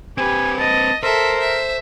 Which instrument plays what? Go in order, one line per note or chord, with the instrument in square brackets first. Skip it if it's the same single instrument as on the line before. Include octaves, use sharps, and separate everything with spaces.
[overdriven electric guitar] C4 B4 [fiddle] G4 [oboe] G#5
[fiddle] D#5 [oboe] A5
[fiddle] A4 E5 [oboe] A#4 [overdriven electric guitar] C5
[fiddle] E5